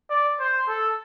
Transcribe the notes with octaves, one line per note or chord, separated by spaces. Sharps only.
D5
C5
A4